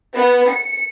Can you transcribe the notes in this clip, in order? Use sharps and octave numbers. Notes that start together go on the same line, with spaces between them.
B3
C#7